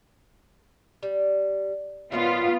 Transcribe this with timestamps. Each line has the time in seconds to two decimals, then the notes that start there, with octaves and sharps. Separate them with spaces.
1.03 G3
2.12 A#2 D#3 F#3 B3 F4